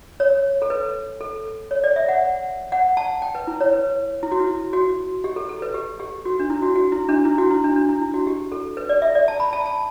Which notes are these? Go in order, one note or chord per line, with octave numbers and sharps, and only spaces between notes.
C#5
A4
B4
A4
C#5
D5
E5
F#5
F#5
A5
G5
B4
E4
C#5
B4
E4
F#4
E4
F#4
G4
A4
A4
B4
G4
G4
F#4
D4
E4
F#4
F#4
E4
D4
E4
F#4
E4
D4
D4
E4
E4
F#4
G4
A4
B4
D5
E5
D5
A5
B5
A5
A5